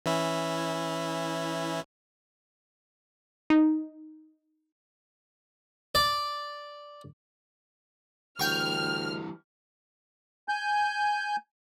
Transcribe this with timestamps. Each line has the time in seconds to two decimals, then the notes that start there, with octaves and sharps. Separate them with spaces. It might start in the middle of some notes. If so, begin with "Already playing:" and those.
0.06 E3 C#4 E4
3.50 D#4
5.95 D5
8.40 D2 E3 G3 G5 C#6 F6
10.48 G#5 G6